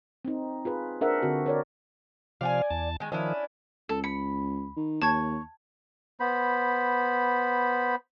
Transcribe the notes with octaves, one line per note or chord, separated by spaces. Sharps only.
C4 D#4
F4 G#4 B4
D4 G#4 A#4 C5 E5 F#5
D3 C4 F#4
A#4 C#5 D5
C3 F3 D5 F5 F#5 G#5
E2 A5
D#3 G#3
D#3 F3 C#4 D4 E4
C#2 A4
B5 C#7
D#3
D#2 C#5 A5 G#6
B3 C5 B5